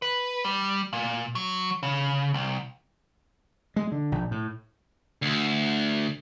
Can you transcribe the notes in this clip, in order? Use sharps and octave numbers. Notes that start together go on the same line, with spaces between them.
B4
G3
A#2
F#3
C#3
C2
G#3
D3
A#1
A2
D2